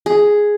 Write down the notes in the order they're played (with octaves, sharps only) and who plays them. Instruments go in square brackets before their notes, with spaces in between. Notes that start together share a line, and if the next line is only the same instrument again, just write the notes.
[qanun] G#4